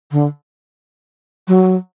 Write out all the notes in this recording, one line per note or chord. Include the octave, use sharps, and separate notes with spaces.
D3
F#3